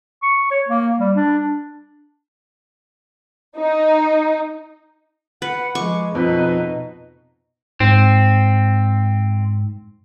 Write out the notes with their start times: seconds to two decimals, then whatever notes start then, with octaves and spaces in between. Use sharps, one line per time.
0.23 C#6
0.51 C#5
0.69 A#3
1.00 G3
1.15 D4
3.58 D#4
5.42 B4 F#5
5.75 F3 G#3 C#6 D6
6.15 F2 B2 D#4 B4
7.80 G#2 C4